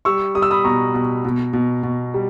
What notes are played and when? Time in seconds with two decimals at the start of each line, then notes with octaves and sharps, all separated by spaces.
0.05 G3 C#6 E6
0.35 G3 D#6
0.42 E6
0.51 B5 D#6
0.64 B2 A#5 C#6
0.94 B2
1.25 B2
1.53 B2
1.83 B2
2.14 G3